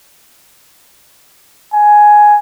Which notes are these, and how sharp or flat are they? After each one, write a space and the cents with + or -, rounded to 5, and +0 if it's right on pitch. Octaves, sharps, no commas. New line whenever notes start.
G#5 +5